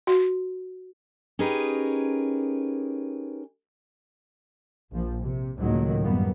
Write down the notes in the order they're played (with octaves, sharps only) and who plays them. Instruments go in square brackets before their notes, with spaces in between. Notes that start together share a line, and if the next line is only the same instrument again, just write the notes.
[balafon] F#4
[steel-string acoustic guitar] C#4 D#4 G4 G#4 A#4 B4
[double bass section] A#1 F3
C3
C#2 A2 D#3 F#3 A#3
F#2 C#3 G3 A#3 B3